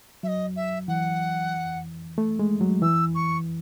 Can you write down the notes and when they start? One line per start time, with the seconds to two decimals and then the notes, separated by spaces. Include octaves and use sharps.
0.23 F#3 D#5 E5
0.56 E5
0.88 E3 F#5
2.18 A3
2.39 G#3
2.61 F#3
2.82 E3 E6
3.14 C#6